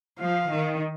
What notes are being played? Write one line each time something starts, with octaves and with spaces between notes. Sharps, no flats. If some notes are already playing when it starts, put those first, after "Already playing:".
F3 F5
D#3